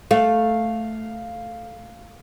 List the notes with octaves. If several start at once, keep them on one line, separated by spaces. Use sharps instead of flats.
A3 F5